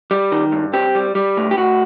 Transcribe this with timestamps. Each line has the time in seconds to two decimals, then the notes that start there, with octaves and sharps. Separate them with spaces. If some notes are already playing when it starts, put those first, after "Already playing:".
0.11 G3
0.32 D#3
0.52 G2
0.73 C4 G4
0.95 G3
1.15 G3
1.37 A2
1.51 G4
1.57 A2 F#4